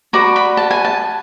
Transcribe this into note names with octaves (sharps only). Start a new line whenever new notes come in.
F#4 B4 D5 A#5
B5
A5
G#5
A5